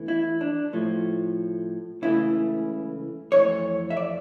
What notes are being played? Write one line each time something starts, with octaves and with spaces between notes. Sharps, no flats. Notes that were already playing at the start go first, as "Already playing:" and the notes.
Already playing: E2 E3 A3
E4
D4
A2 F3 A3
C#2 C#3 E3 A3 E4
F2 E3 A3 C#5
E5
D5